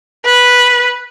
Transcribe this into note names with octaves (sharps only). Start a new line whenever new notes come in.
B4